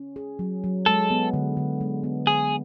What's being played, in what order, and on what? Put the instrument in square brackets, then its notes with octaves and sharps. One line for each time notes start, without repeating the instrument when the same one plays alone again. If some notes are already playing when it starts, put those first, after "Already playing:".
Already playing: [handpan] C#4
G#4
F#3
F#3
[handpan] G#3 [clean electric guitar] A4
[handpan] B3
D3
D3
G#3
B3
[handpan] D3 [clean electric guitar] G#4